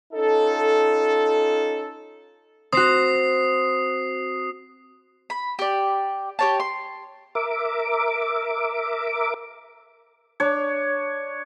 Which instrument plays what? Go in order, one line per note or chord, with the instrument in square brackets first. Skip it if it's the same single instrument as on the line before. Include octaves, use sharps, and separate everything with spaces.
[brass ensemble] C#4 D#4 F4 A4
[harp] C4 F#4 [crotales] D#6 C7
[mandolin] B5
G4 D5
G4 C#5 A5
C6
[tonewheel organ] A#4 E5 D6
[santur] D4 C#5